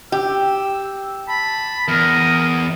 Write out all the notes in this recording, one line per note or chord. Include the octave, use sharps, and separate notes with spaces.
G4 E6
A5 B5
E2 A#4 D#6